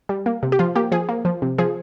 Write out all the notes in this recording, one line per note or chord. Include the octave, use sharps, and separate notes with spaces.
G3
A#3
C3
G4
F3 F4
A#3 G4
F3 G#4
A#3
F3
C3
F3 G#4